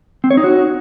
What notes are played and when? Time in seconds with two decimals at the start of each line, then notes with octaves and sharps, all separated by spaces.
0.24 C4
0.31 C#5
0.37 D#4
0.44 F#4